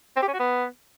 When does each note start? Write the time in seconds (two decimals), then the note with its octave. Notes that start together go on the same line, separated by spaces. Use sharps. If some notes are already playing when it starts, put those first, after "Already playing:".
0.16 C4
0.22 G4
0.28 C#4
0.33 F#4
0.39 B3